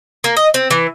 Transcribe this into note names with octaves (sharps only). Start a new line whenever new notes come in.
A#3
D#5
C4
E3